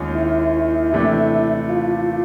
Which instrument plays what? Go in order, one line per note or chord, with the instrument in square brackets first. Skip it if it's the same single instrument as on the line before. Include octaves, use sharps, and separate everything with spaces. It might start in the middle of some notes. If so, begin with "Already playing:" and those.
Already playing: [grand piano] D#2 D#3 G#3 C#4 F4
[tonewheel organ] E4
[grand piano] C3 E3 A3 D4 G4
[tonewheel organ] F4